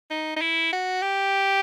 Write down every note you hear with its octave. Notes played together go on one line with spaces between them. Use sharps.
D#4
D#4
E4
F#4
G4